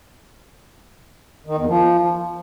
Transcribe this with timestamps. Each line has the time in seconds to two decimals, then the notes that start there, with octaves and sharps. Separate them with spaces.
1.47 D#3
1.57 E2
1.68 F3